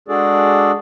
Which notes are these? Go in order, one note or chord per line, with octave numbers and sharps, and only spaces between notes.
G#3 D4 F#4 G#4 A4 D5